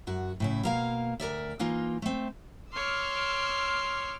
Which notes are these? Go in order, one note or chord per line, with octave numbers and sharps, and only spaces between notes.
F#2 F#4
A2 C#3 E4
B2 A#3 F5
D2 A#4 D5 E5
E3 A#3 D#4 F4
A3 C4
C#5 C6 D6 E6 F6